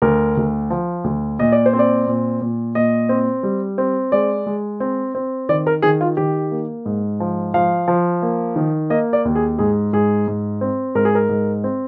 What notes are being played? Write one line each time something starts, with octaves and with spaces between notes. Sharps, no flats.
D2 A#4
D2
F3
D2
A#2 D#5
D5
C5
C4
D5
A#2
A#2
A#2 D#5
C4
G3
C4
G#3 D5
G#3
C4
C4
D#3 D5
A#4
D#3 G#4
F4
D#3 G4
A#3
G#2
F3
F3 F5
F3
A#3
D#3
A#3 D#5
D5
D#2
G#4
G#2 G#4
G#2 G#4
G#2
C4
G#2 A#4
G#4
A#4
G#2
C4